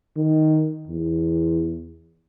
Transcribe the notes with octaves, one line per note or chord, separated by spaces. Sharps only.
D#3
E2